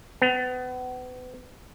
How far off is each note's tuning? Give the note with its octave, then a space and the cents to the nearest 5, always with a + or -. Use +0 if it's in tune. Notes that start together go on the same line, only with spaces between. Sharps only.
B3 +35